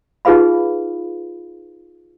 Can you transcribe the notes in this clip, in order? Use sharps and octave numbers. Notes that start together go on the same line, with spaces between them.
D#4 F4 G#4 B4 F5 B5